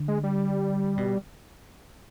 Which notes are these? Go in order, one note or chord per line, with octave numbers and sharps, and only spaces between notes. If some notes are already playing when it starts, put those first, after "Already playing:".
Already playing: D3
G#3
G3
B2